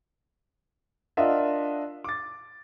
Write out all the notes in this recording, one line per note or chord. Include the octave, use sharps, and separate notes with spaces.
D4 F4 A#4 D#5 E5 F#5
D6 A6